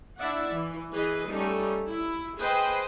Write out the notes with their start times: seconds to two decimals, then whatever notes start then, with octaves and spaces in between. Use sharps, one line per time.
0.19 D4 E4 D5 E5 F#5
0.50 E3
0.92 E3 G#4 B4 D#5
1.28 G3 A3 C#4 D#4
1.87 E4
2.38 G#4 B4 C5 D#5 G5